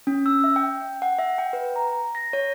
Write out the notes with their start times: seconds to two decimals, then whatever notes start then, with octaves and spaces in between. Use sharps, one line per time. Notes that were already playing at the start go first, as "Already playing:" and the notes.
0.07 C#4
0.26 E6
0.44 E5
0.56 G5
1.02 F#5
1.18 E5
1.38 G5
1.53 B4
1.76 A#5
2.15 A#6
2.33 C#5